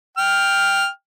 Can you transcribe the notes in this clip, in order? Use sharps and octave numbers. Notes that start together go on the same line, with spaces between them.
G5 F6